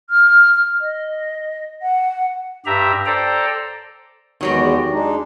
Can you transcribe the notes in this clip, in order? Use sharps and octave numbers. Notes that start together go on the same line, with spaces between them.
F6
D#5
F#5
G2 G4 E5 A#5
A4 C5 D5 G5 A#5
E2 D#3 F#3 G#3 B3 G4
G#3 D4 D#4